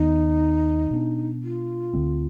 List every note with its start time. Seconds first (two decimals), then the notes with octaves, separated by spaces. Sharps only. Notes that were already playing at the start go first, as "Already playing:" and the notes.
Already playing: D#2 D#3 B3 D#4
0.91 B2 B3 D4
1.43 F4
1.93 D2 D3 G#3 C4